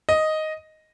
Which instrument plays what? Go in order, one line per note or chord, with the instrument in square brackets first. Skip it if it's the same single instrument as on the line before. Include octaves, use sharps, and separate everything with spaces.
[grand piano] D#5